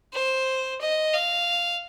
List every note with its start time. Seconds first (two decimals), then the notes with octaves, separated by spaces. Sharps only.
0.14 C5
0.81 D#5
1.14 F5